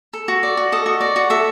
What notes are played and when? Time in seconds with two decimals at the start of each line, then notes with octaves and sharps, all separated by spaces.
0.13 A4
0.28 F#4
0.43 D5
0.57 F#4
0.72 A4 D#5
0.86 F#4
1.01 D5
1.16 F#4
1.30 A4 E5